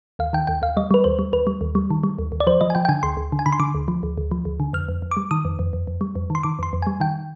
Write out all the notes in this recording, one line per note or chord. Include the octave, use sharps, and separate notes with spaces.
D#2 F5
D#3 G5
D#2 G5
D#2 F5
G3 D#5
G3 B4
D#2 C5
G3
D#2 B4
G3
D#2
G3
D#3
G3
D#2
D#2
D5
F3 C5
F3 D#5
G#5
F3 G5
G5
D3 G#5
D2 C6
D2
D3
G#5
D3 B5
C6
D3 D6
D2
F3
D2
D2
F3
D2
D3
F2 F6
F2
F2
D6
G3
D#3 D#6
F2
F2
F2
F2
G3
F2
D#3 C6
D#3 D6
F2 C6
F2
G3 G#5
D#3 G5